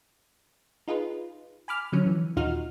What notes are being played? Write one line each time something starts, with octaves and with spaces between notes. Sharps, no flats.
D#4 F4 G#4 B4
G#5 B5 D6 F6
D3 F3 F#3 C#4
E3
D#2 A#2 D#4 F4 F#4 F6